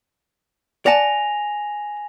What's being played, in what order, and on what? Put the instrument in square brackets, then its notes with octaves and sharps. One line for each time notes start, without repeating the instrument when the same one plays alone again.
[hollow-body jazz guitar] D5 F#5 A5 [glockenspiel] G#5 A#6 F7